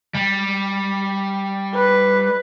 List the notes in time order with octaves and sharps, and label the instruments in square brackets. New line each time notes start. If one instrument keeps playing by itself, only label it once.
[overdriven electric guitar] G3
[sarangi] B4